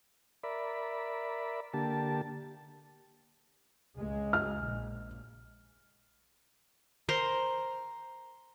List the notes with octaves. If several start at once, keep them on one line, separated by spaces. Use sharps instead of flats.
A#4 D5 E5 B5
D3 A#3 G4 A5
C#2 G#3
F6
A#1
A#4 C5 A#5 C6